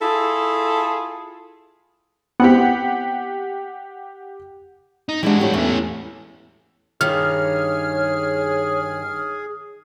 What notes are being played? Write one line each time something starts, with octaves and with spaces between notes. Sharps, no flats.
E4 F4 G#4 A4
B3 C4 E4 G4 F#5
D#4
E3 G3 G#3 D4 F#4
A2 G4 C#5
E2 A3 C#4
G2 D#3 G#4 C#5 F6